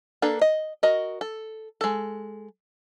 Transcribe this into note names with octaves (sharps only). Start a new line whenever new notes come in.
A#3 D4 A4 B4
D#5
F#4 A#4 D#5
A4
G#3 A4